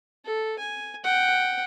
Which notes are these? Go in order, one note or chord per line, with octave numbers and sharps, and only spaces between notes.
A4
G#5
F#5 G5